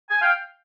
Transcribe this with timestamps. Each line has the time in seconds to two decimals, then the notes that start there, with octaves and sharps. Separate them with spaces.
0.10 G#5
0.21 F5 G5